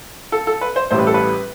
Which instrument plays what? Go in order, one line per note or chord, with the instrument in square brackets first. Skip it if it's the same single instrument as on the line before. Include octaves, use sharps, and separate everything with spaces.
[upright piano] A4
A4
B4
C5
A1 A2 G3 C5
B4
A4
B4